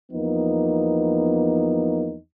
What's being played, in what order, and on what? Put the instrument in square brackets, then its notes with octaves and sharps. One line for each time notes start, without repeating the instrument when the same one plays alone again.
[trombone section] E2 F3 A#3 B3 D#4